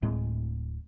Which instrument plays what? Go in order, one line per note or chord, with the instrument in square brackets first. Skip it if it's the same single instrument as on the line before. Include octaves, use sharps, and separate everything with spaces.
[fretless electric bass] D1 A2 G#3 C4